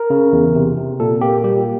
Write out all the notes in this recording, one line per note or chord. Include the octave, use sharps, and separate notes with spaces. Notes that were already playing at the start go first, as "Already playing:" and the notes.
Already playing: A#4
C#3
E2
C3
C3
A#2 A4
A#3 G4
G3 G4